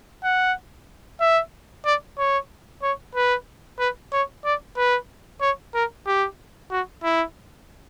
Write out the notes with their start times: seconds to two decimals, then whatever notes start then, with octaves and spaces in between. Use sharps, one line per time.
0.24 F#5
1.20 E5
1.85 D5
2.19 C#5
2.82 C#5
3.15 B4
3.79 B4
4.13 C#5
4.45 D5
4.77 B4
5.41 C#5
5.74 A#4
6.07 G4
6.71 F#4
7.03 E4